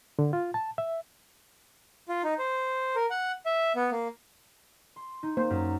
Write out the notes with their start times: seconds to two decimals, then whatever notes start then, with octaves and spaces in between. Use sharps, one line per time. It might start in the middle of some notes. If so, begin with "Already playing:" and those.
0.19 D3
0.33 F4
0.54 A5
0.78 E5
2.09 F4
2.24 D#4
2.39 C5
2.96 A#4
3.11 F#5
3.46 E5
3.76 B3
3.92 A#3
4.96 C6
5.23 D#4
5.37 A#3 C5
5.50 F#2